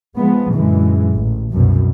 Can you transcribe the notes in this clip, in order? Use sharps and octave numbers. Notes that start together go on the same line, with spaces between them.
F3 G#3 B3
F#2 A#2 D3 E3 G#3
A1
C2 F#2 B2